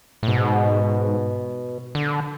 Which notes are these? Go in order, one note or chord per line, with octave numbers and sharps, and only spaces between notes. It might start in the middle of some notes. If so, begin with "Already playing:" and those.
A2
G#2 B2
D3